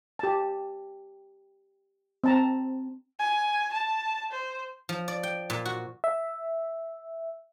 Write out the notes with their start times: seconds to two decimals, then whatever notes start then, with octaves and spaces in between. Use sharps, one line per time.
0.19 G4 A5
2.24 C4 A5 A#5
3.19 G#5
3.73 A5
4.31 C5
4.89 F3
5.08 D5
5.23 G5
5.50 A#2
5.66 F#4
6.04 E5